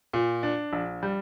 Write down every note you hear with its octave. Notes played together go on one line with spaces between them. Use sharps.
A#2
D4
A#1
G3